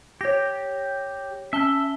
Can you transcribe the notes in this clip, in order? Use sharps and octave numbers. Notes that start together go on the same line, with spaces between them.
G4 C#5 A#6
C#4 E5 A5 G7